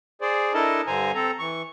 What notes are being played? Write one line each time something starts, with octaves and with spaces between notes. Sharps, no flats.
G#4 C5 D5
D4 E4 A4 A#4 D#5 A5
G2 D3 C5 G#5 A#5
C4 A4 A#5
E3 C#6